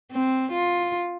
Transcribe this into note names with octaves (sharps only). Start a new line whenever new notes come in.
C4
F4